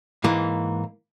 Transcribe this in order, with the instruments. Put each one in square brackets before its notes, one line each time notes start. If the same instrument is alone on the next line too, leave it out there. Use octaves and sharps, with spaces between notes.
[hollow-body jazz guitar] G#2 E3 A#3